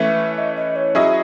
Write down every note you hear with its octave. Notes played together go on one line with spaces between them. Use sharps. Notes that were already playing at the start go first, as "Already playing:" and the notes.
Already playing: E3 A3 C#4 E5
D#5
D#5
C#5
F#3 C#4 E4 G#4 D#5 E5